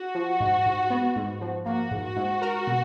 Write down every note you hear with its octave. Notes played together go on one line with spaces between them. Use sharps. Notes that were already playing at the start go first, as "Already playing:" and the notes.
Already playing: F#4
F3
G#2
G#2
B3
G#2
F3
A#3 F#4
G#2
F#4
G#2
A#4
B2